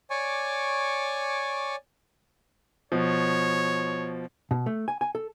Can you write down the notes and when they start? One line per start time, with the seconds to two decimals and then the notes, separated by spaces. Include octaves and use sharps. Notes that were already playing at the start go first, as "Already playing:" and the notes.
0.10 C#5 D5 G#5 C#6 D6
2.92 B2 F3 C#5
4.51 B2
4.66 A3
4.88 G#5
5.01 G#5
5.15 A4